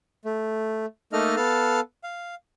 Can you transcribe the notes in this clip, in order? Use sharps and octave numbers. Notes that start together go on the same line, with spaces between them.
A3
A3 A#3 D#4 A4 D#5 F6
B3 A4 F5 A5 F6
F5